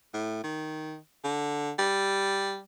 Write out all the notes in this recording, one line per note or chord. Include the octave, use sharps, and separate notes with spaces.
A2
D#3
D3
G3